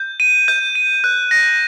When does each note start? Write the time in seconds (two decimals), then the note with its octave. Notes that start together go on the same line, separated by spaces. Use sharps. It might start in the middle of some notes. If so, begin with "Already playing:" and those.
Already playing: G6
0.20 D#7
0.48 G6
0.75 D#7
1.04 F#6
1.31 A#6